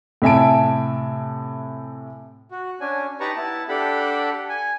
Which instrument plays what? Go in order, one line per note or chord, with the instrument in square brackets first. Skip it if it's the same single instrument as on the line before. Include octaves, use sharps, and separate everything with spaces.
[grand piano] A2 C3 E5 G#5 A5 D7
[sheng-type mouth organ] F#4
C#4 D4 G#5
D#4 G4 B4 A5 A#5 C#6
B3 E4 A5
D4 G4 A4 F#5 B5
G#5